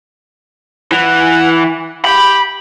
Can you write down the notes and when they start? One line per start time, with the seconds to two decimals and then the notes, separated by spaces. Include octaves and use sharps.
0.92 E3 F#5
2.05 G4 B5